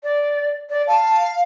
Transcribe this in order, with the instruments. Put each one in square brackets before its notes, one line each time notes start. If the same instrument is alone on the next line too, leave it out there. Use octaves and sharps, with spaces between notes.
[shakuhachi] D5
D5
[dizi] F5 [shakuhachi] A5